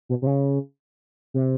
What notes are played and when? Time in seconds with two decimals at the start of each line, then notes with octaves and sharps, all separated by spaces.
0.09 B2
0.22 C3
0.27 C#3
1.34 C3